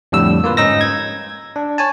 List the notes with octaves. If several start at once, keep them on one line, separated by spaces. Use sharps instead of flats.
F2 A2 D3 G3 E6
A#3 F4 B4
G#2 C#4 D#4 E6 A#6
G#6
D4
C#5 G#5 A5